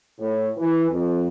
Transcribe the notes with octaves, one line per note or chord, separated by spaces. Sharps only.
A2
E3
F2